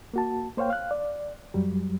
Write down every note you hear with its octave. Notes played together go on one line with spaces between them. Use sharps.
A#3 F#4 A5
A#3 C5 C#5 F5 G5
F5 F#6
D5
F#2 F#3 G3